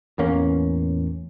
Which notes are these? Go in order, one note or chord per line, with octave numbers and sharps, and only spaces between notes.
A1 E2 A#3 C#4